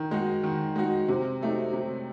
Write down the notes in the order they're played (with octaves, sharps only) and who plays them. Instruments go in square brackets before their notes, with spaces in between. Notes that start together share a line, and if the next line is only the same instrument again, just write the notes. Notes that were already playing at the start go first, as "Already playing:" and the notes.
Already playing: [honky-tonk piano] D#3
G#3 D#4 F#4
D#3
G#3 D#4 F#4
C3
F#3 A3 D#4
C3